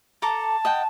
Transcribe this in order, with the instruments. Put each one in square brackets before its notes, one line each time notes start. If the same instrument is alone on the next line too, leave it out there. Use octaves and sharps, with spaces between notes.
[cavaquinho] A4 A#5 D6 [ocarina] A5
[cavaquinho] D#5 F#5 G5